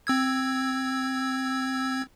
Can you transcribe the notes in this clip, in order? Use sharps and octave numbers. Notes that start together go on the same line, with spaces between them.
C4 E6 G#6